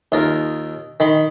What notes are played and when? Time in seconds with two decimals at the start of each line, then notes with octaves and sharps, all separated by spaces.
0.12 D#2 F4 A#4
1.00 D#3 B5 C6